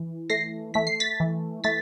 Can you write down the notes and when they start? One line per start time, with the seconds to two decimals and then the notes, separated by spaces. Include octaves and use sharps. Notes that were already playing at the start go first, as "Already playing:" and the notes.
Already playing: E3
0.30 A3 A#6 C7
0.74 A3 B6
0.87 C7
1.00 A6 B6
1.20 E3
1.64 A3 A6 B6